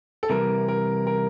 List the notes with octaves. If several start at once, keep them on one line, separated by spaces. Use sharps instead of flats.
A4
C3 E3 G3 A#4
A#4
A#4